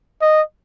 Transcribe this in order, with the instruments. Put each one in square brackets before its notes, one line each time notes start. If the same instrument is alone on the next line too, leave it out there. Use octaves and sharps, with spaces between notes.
[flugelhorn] D#5